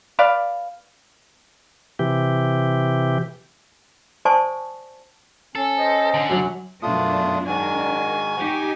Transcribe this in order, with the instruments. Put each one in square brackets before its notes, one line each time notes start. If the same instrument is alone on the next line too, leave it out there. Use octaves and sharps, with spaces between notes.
[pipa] B4 D5 F5
[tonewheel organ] C3 E3 G4
[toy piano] C5 D5 G#5 A5 C#6 D#6
[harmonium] C#4 [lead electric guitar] A4
[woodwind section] C5 D#5
[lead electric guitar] D3
[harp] F#2 F#3
[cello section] F#2 B2 D4 [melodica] A3 F4 D#6
[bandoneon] G#2 D#3 [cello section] D4 A#4 [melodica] F#4 [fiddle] G#5
[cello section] D#4 G4